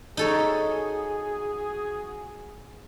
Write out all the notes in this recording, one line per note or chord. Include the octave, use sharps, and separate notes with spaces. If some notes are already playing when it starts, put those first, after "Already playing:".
D#4 F#4 G#4 A4 C#5